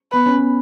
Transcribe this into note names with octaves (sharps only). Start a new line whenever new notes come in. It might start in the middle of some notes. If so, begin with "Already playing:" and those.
B3 B4
C#4
B3